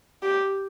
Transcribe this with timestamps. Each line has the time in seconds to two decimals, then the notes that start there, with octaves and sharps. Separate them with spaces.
0.22 G4